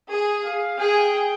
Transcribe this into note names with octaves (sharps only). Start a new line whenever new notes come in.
G#4
F5
G#4 G5